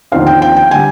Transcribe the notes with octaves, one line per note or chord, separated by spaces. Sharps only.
D#2 D3 F3 C4 D#4 F5
G5
G5
G5
D3 G3 G#5